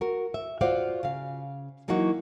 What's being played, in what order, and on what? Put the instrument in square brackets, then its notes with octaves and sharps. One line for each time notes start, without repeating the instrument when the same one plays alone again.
[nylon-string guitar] F#4 A#4
E5
F4 F#4 C5 D5 F5 F#5
C#3 F5
E3 F#3 A#3 D#4 F#4